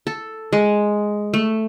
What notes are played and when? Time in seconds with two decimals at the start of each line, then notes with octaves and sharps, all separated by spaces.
0.07 A4
0.53 G#3
1.34 A3